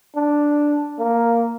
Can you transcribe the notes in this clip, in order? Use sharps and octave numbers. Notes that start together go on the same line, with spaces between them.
D4
A#3